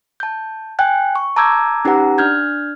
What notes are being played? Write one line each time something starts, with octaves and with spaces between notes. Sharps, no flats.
A5 G6
G5 G#5 F#6 G6
C#6
A5 A#5 D6 E6 G6 G#6
C#4 D#4 G4 B4 F#5 A#5
D4 F6 G6 G#6